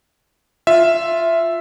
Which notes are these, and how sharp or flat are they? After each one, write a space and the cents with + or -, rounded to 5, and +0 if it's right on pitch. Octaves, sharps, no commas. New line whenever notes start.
F4 +0 E5 +5